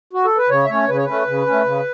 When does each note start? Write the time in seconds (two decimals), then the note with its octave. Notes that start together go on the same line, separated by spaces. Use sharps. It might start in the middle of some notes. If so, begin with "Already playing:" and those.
0.13 F#4
0.25 A4
0.37 B4
0.49 C#3 C#5
0.65 E5
0.69 A3 C#4 C#5
0.89 C#3 B4
0.97 C#5
1.05 A3 C#4 B4
1.27 C#3
1.46 C#4
1.51 A3
1.65 C#3